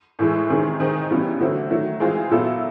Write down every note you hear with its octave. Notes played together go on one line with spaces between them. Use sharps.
A2 E3 G#3
C3 D#3 G#3 C#4
D#3 G#3 C4 D#4
C#3 E3 G3 B3
D3 F#3 A3 C4
D#3 F#3 A3
E3 G#3 C4 F4 G#4
A#2 F#3 B3 E4 A4